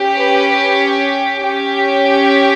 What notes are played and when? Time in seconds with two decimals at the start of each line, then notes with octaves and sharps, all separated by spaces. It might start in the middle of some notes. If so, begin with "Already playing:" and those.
Already playing: C#4 G4
0.16 B4
1.44 C#4 G4